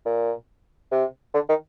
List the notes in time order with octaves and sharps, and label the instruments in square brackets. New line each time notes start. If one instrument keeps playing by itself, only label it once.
[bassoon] A#2
C3
D3
D#3